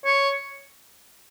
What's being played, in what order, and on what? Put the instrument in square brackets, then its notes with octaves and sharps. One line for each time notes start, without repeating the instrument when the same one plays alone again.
[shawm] C#5